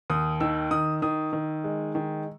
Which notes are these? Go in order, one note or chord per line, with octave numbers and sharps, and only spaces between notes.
D#2 D#6
D#3 E6
D#3 D#6
D#3 D#6
D#3
G#3
D#3